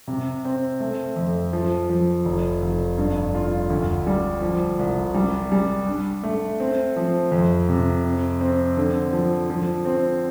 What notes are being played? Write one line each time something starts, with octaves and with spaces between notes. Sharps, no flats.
C3
C4
A3
F2
F3
F3
F1
F1
G2
F4
D2
G3
F3
C2
G3
G3
D4
A3
C4
F3
F2
C3
C4
C4
D3
F3
F3
C4